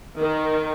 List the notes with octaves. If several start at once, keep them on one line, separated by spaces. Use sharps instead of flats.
D#3